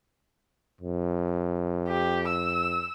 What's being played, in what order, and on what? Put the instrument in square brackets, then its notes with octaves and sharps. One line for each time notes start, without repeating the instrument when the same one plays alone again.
[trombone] F2
[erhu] G4
E6